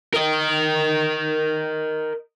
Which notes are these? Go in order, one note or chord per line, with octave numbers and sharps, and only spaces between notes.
A#4 D#5